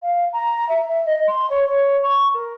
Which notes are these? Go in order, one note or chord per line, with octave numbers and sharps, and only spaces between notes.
F5
A#5
E5
E5
D#5
C6
C#5
C#5
C#6
A#4